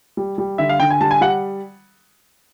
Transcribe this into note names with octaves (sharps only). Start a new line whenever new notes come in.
G3
G3
D3 E5
F5
D3 G5
G#5
G3 A5
G#5
G3 F#5